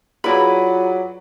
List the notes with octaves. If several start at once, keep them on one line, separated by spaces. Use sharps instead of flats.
F#3 E4 F4 G#4 B4 D5 A#5 B5